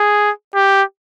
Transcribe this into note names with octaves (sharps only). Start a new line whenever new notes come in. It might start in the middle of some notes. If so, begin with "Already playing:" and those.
Already playing: G#4
G4